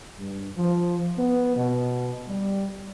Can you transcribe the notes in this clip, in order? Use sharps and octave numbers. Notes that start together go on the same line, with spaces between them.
G2
F3
B3
B2
G3